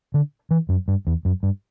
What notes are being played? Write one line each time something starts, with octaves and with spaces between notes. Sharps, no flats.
D3
E3
F#2
G2
E2
F#2
G2